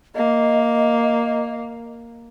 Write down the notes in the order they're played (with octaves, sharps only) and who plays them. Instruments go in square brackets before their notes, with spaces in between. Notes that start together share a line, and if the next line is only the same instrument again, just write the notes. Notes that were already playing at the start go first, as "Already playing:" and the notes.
[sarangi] A#3 [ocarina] D#5